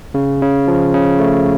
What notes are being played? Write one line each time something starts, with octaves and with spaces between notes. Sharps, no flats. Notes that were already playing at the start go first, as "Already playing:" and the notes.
C#3
C#3
F3
C#3
A3